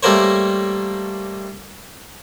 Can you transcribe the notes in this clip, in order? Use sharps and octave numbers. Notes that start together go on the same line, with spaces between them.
G3 A3 A#3 A#4 C5 C#5